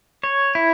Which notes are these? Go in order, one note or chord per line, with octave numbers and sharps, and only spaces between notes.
C#5
E4